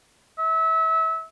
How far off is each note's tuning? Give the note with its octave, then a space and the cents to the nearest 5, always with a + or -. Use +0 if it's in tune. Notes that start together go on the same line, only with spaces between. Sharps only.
E5 -25